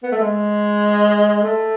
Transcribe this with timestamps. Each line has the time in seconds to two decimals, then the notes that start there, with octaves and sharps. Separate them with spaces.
0.03 B3
0.12 A3
0.21 G#3
1.43 A3